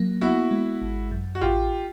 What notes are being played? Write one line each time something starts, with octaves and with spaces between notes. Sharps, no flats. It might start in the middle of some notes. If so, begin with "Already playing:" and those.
Already playing: F#3 A#3
B3 E4 F#4
G#3
G#1
F#2
F#4
A1 F4 G4